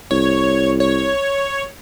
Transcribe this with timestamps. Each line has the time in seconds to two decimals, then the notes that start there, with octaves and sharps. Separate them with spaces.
0.11 C2 C#5
0.80 C#5